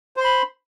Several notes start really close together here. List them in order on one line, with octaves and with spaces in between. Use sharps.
C5 C6 B5